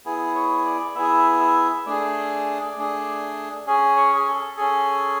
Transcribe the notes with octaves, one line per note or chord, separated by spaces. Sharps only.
B3 E4 G#4
C#5
D5
B3 E4 G#4 E5
E5
A3 D4 G#4 D5
A3 D4 G#4
C#4 G#4
C#5
G#4
A4
C#4 G#4 A4